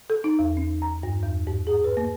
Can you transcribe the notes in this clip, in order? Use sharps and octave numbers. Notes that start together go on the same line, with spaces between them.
A4
D#4
E2
C#4
A#5
G2
E2
G#2
G#4
B4
A#3